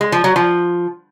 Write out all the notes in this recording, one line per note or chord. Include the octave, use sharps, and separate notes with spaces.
G#3
F3
F#3
F3